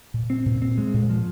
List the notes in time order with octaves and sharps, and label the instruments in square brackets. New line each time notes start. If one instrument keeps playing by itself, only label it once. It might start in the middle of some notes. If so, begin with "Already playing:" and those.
[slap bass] A#2
C4
A#2
C4
G#3
A#2
F3